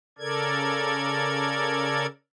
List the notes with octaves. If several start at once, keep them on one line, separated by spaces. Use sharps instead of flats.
C#3 A4 A#4 D5 G#6